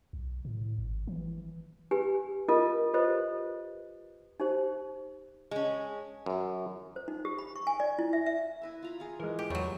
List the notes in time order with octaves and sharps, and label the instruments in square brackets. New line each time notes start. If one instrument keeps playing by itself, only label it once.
[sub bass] B1
A2
G#1
E3
[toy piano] G4 B4 G#5
F4 A4 A#4 D#5
F4 G4 A4 B4 C5 D#5
D#4 G4 C5
[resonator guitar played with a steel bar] G#3 C#4
[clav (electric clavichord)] F#2
[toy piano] C5
D#4
G4
B5
C#6
G#5
D5
E4
E5
E5
[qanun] E4 B4 E5
F4 A#5 B5
F4 G#4
[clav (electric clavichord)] E3 G#3 [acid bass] A#4
[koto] G4
[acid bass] E2 [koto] F#3 A3 [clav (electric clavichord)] G4 B4 C#5